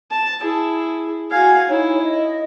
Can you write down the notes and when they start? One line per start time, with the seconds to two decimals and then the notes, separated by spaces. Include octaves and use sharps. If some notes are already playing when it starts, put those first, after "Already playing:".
0.11 A5
0.41 E4 G#4
1.31 F#4 F5 G#5 G#6
1.69 D#4 E4 C#5
2.03 D#5